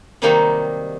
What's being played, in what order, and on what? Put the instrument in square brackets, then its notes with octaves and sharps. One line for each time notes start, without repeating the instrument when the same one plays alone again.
[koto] C3 D#3 F#3 G3 A#3 D#4